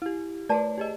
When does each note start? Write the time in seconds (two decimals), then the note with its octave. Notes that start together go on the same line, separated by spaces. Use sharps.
0.02 E4 G4
0.49 A3 B4 C#5 D5 A5
0.78 G4 G#4 D#5